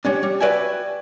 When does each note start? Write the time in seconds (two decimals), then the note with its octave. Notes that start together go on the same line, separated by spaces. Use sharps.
0.05 G3 C#4 D4
0.23 G3
0.40 F#4 B4 D5 E5 G5 G#5